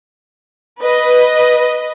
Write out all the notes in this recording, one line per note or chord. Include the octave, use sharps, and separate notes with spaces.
B4 D#5